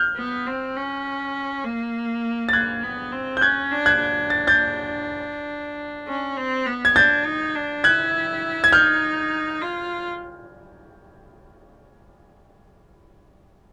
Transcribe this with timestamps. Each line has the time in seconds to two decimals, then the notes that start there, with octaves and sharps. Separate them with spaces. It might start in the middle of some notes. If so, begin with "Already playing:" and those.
Already playing: F6 G6
0.17 B3
0.47 C4
0.76 C#4
1.65 A#3
2.49 A6
2.53 A#3 F#6 G#6
2.83 B3
3.12 C4
3.37 G6
3.41 C#4 F#6 G#6
3.72 D4
3.86 F#6 G#6
4.01 D4
4.30 A6
4.47 G6 A6
6.08 C#4
6.37 C4
6.67 B3
6.85 G#6
6.96 D4 G6 A6
7.26 D#4
7.55 D4
7.84 E4 F#6 G#6
8.64 G#6
8.73 D#4 F6 G6
9.62 F4